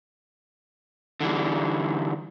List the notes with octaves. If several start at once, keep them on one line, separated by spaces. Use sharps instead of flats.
D3 E3 G3